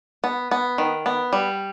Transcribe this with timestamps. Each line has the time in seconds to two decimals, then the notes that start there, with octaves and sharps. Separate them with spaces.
0.24 B3
0.51 B3
0.78 D#3
1.06 B3
1.33 G3